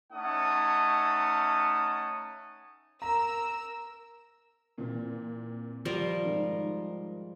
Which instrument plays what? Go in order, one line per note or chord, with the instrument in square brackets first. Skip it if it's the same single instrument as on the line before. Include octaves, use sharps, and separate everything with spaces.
[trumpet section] A3 C#4 D#4 F#5 A5 D#6
[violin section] A#4 E6 [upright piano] A#5
[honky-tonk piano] A#2 E3 C4
[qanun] F3 G3 A#4
[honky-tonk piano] G#2 D#3